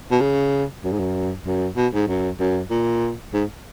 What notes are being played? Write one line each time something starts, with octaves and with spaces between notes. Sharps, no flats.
B2
C#3
F#2
G#2
F#2
F#2
B2
G#2
F#2
F#2
A#2
G#2